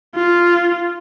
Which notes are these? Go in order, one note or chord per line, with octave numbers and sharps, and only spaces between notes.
F4